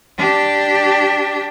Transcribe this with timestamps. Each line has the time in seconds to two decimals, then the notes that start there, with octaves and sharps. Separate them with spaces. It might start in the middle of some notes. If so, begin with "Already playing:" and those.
0.18 D4 G4